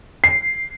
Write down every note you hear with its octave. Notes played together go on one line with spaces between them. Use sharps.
C7